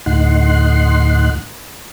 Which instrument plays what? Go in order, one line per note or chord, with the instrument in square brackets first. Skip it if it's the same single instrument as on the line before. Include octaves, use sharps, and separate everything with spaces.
[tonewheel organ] D2 A2 D#4 F#5 C6